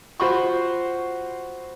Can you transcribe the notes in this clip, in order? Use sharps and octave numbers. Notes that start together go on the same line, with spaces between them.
F4 F#4 C5 B5 C#6